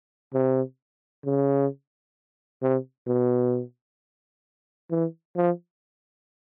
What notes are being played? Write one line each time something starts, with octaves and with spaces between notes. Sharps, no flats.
C3
C#3
C3
B2
E3
F3